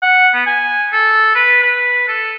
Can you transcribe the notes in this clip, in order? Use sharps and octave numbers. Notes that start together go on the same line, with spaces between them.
F#5
B3
G#5
A4
B4
B4
A4